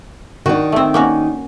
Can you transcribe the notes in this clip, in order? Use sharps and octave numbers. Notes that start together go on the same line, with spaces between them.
D#3 D4 F#4
A3 C4
A#3 C#4 F#4